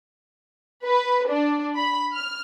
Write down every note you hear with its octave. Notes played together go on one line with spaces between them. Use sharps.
B4
D4
B5
F6